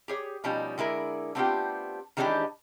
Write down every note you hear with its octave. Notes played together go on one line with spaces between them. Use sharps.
G4 G#4 C#5
B2 F3 G3 C#4 D#4
D3 G#3 E4 A#4
A3 B3 C4 D4 F4 G4
D#3 E3 G#3 C#4 D4 G4